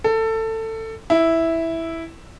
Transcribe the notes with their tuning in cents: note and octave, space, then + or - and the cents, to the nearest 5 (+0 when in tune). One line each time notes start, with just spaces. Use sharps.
A4 +20
E4 -5